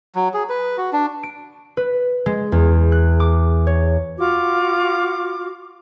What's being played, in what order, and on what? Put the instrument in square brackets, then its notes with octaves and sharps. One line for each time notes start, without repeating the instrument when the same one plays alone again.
[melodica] F#3
G#4
B4
F#4
D4
[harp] D7
B4
G#3
E2
F#6
D6
C#5
[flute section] F4 F#4 D6